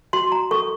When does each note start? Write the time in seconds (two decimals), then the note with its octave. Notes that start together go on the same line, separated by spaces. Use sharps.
0.13 F#4 C6
0.32 A#5
0.51 A4 C#6